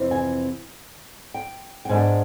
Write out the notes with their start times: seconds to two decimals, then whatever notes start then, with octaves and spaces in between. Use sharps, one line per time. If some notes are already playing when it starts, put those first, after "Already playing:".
Already playing: F2 C3 E3
0.11 G#5
1.34 G5
1.85 G5
1.89 G#2 D#3 G#3 B3 D4 G#5